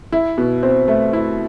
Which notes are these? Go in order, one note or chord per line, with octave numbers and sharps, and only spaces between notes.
E4
B2
C4
A3
E4